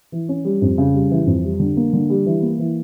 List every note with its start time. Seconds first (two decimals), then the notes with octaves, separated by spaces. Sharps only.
0.12 E3
0.29 C#4
0.45 G3
0.62 F2
0.78 C#3
0.94 G3
1.11 E3
1.27 F2
1.44 G3
1.60 D3
1.77 A#3
1.93 D3
2.10 G3
2.26 E3
2.42 A#3
2.59 E3